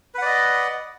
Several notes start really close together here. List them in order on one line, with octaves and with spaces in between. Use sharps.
B4 F#5 D5 D#5